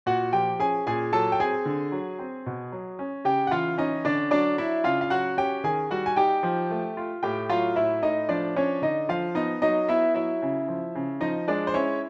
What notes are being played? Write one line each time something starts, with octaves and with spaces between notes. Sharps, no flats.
A#2 F#4 F#5
F3 G4 G5
C#4 G#4 G#5
A#2 G#4 G#5
F#3 A4 A5
G5
C4 G#4 G#5
D3
F#3
C4
B2
F#3
C#4
C#3 G4 G5
F#5
E3 F4 F5
C#4 D#4 D#5
D3 D4 D5
F#3 D4 D5
D4 E4 E5
C#3 F4 F5
F5
F#3 F#4 F#5
C#4 G4 G5
D#3 G#4 G#5
G3 F#4 F#5
G#5
D#4 G4 G5
F3
A3
F4
A2 G4 G5
F#3 F4 F5
A2 E4 E5
A2 D#4 D#5
F3 D4 D5
C#4 D4 C#5
D3 D#4 D#5
F3 F4 F5
B3 D#4 D#5
F#3 D#4 D#5
B3 E4 E5
F#3 E4 E5
C#3
F3
C#3
F3 D#4 D#5
G#3 D4 D5
C5
C#4 E4 C#5